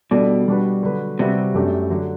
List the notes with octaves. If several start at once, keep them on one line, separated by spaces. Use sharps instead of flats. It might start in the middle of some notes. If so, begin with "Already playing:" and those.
B2 G3 D4 A4 D5
B2 G3 D4 F#4 B4
D3 F#3 B3 F#4 B4
C3 G3 C4 F#4 B4 E5
F#2 F#3 A3 D4 G4
D3 F#3